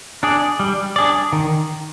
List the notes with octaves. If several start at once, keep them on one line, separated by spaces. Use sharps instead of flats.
D4 G#4 D5
G3
D4 G#4 D5
D#3